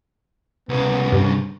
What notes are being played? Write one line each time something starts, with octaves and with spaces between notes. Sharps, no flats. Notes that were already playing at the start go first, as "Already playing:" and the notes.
C2 C#3 B3
G2